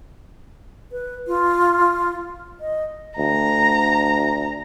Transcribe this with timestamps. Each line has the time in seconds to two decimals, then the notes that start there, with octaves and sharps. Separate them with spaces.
0.92 B4
1.27 F4
2.60 D#5
3.18 D2 A#5